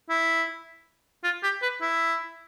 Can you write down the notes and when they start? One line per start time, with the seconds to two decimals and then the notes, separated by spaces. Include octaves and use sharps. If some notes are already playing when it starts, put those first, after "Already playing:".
0.09 E4
1.24 F4
1.43 G4
1.62 B4
1.81 E4